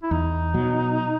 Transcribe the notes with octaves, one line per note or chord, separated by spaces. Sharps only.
E4
E2 D#4
B2 F#3